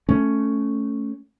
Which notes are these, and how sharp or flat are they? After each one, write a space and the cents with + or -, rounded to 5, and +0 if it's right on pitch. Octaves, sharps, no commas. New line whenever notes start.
A3 +0 C#4 +0